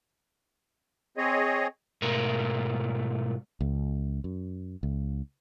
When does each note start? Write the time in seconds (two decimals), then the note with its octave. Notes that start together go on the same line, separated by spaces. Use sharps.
1.17 C4 G#4 C#5 D#5
2.02 G#2 B2 A3 A#4
3.61 C#2
4.24 F#2
4.83 C#2